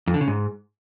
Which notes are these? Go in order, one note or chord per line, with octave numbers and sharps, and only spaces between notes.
F2
D3
C#3
G#2